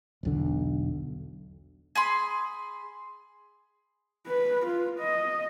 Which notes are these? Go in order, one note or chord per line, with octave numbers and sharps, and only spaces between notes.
E1 B1 D3
G#4 B5 C6
B4
F4
D#5